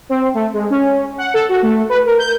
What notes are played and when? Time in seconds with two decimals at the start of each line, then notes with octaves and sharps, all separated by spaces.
0.09 C4
0.34 A3
0.54 G#3
0.70 C#4
1.18 F#5
1.34 A4
1.49 F#4
1.63 A3
1.89 B4
2.06 A#4
2.19 G6